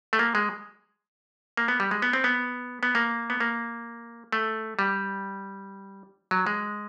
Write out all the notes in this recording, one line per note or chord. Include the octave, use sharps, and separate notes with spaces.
A3
A#3
G#3
A#3
B3
G3
G#3
B3
C4
B3
B3
A#3
B3
A#3
A3
G3
F#3
G#3